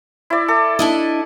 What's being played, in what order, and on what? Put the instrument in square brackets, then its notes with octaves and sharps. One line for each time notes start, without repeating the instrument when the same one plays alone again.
[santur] E4 D5
A4
[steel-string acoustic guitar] D4 E4 D#5